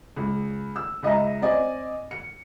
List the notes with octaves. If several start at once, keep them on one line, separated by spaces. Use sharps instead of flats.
C#2
E6
C#2 D#5 E5 A#5
C4 D5 D#5 G#5
C#7